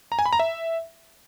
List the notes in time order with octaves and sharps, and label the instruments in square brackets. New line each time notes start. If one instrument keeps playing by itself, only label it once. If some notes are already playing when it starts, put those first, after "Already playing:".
[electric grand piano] A#5
G#5
B5
A#5
E5